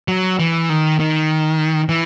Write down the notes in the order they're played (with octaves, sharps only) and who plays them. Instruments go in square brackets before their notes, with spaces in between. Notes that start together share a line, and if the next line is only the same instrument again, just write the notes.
[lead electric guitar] F#3
E3
D#3
D#3
E3